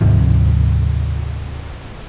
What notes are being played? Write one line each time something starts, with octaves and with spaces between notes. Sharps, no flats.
D2 G#2 C3 F3